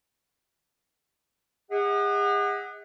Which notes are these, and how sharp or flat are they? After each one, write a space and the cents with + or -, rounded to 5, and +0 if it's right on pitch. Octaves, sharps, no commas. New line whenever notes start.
G#4 -40 D#5 +40 F#5 +0